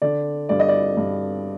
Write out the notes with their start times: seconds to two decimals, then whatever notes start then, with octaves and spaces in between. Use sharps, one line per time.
0.02 D3 D5
0.49 G2 D5
0.60 D#5
0.69 D5
0.97 G2